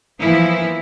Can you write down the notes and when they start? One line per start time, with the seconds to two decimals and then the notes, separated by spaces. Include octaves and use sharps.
0.20 E3 F3 A#3 B3 E4